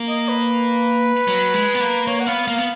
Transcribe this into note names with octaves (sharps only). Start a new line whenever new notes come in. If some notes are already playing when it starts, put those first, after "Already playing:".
Already playing: A#3
D#5
B4
F#3
G#3
B3
A#3
A#3 C#5
F#5
B3 F5
A#3 F5
B3